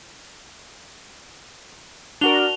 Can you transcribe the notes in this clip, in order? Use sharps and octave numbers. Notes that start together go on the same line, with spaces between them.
D4 F#4 A#4 F7 G7